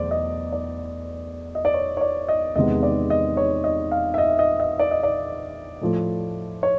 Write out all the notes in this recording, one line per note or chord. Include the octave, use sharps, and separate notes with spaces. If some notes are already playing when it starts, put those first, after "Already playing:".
Already playing: E2 B2 F#3 A3 C5 D5
D#5
D5
D#5
D5
C#5
C#5
D5
D#5
E2 C3 D#3 G#3 B3 D#5
D5
D#5
C#5
D#5
F5
E5
D#5
D#5
D#5
D5
D#5
D5
A2 F3 A3
C#5